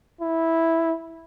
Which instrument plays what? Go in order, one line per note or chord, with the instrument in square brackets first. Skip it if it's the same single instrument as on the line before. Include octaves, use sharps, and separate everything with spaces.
[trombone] E4